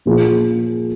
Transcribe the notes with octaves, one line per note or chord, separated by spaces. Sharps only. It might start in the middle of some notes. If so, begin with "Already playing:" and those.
A#2 F3 A#3 F4 G#4